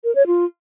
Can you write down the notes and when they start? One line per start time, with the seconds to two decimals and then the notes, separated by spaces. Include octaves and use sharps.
0.04 A#4
0.15 C#5
0.27 F4